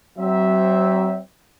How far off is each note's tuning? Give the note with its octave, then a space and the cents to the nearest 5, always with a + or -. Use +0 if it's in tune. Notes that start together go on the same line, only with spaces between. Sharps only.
F#3 +35 C4 +0 E5 -10